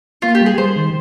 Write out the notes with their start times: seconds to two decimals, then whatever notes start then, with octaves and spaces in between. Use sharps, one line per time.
0.22 A#3 F4
0.35 G4
0.41 G3
0.46 G#4
0.58 G3 C5
0.76 D#3